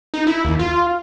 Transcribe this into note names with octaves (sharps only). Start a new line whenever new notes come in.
D#4
E4
D#2
F4